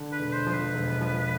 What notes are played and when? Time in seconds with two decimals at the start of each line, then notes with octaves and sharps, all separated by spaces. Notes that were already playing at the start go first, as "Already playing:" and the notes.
Already playing: D3
0.12 B4
0.19 E1
0.33 C5
0.47 F3
0.54 B4
0.74 E1
1.01 F3